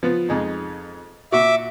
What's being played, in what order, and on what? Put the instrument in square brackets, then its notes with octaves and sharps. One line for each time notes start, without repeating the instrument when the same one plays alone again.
[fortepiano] F3 B3
F2 G#3 D#4
[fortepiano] A#2 F#4 [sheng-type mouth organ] E5 D6